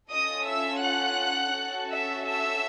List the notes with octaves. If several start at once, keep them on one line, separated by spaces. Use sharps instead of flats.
C#4 F4 A4 D#5 D#6
E5 E6
F#5 F#6
C#4 F#4 A4
E5 E6
E5 E6